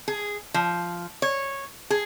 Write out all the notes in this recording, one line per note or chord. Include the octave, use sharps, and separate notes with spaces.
G#4
F3
C#5
G#4